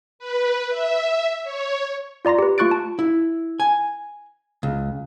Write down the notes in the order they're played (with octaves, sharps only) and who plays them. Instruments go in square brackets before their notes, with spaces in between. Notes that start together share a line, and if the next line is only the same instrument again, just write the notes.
[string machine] B4
E5
C#5
[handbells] F4 D5 A#5 C6 A#6
G4 B4
A3 F4 C#6 F#6 A6 D7
A5
[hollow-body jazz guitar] E4
G#5
C#2